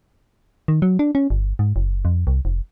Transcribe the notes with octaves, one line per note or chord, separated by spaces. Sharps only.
D#3
F#3
D4
C#4
G1
G#2
F#1
F2
C2
F1